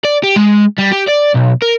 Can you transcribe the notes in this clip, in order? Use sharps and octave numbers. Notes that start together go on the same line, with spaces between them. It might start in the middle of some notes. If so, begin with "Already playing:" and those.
D5
G4
G#3
G3
G4
D5
B1
A#4